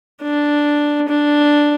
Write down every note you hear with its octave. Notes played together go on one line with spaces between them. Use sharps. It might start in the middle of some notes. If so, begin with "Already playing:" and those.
D4
D4